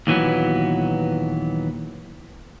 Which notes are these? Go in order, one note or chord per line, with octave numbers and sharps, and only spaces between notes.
D#2 A#2 E3 F#3 B3